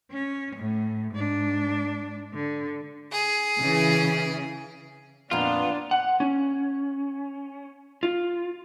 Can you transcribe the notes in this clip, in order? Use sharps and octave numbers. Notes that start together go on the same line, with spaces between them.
C#4
A2
G#2 D4
D3
G#4
C#3 E3
F2 A#2 B3 D4 F4
F#5
C#4
F4